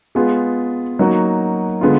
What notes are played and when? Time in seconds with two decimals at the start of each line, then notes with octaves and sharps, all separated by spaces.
0.15 G#3 B3 F4 G#4
0.99 F#3 A#3 D#4 F#4
1.81 D3 G#3 B3 F4